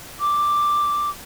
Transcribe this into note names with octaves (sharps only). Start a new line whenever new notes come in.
D6